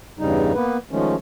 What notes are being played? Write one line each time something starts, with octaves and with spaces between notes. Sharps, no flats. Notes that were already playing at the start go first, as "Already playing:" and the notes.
E2 G2 C#3 G3 D#4
A#3 B3 B4
D#3 F3 G#3 A3 C#4